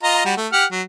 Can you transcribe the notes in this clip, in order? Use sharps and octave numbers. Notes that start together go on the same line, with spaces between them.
F4 D#5 A#5
G3 F#4
A3
G4 F#5 F6
F#3